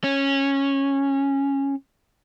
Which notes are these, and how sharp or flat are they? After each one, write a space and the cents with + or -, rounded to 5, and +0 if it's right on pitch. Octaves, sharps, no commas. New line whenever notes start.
C#4 -10